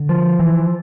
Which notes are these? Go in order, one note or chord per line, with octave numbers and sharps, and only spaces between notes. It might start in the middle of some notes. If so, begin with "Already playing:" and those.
Already playing: D3
F3
E3